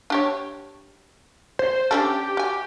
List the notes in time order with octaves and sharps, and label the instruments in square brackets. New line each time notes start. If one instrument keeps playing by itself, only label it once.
[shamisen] D4 G4 C#5
[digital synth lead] C5
[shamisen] C#4 D4 A4 [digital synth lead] G4
[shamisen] F#4 G#5